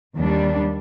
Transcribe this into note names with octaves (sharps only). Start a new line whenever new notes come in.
D#2 G3 D4